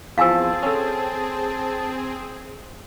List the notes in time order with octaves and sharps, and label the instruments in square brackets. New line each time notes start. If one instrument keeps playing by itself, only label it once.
[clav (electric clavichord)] E2 F3 [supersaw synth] C4 G#4 [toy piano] F5 G#5 E6 [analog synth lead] A5
[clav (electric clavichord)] C#4 A4